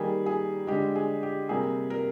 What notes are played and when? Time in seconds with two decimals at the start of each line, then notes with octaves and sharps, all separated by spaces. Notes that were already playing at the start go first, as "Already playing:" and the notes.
Already playing: D#3 G3 A#3 G#4
0.26 G#4
0.67 D3 G#3 G4
0.95 G#4
1.23 G4
1.49 C3 G3 A#3 G#4
1.90 A#4